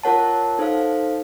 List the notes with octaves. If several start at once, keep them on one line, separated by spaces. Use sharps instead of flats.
F4 A#4 C#5 F#5 A5
D#4 A4 C5 F5